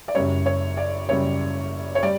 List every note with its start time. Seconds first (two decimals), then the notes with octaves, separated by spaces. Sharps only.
0.08 D5
0.15 F#1 F#2 C#3 G3 C#5
0.46 C#5
0.77 D5
1.09 F#1 F#2 C#3 G3 C#5
1.95 C#5
2.03 G3 D5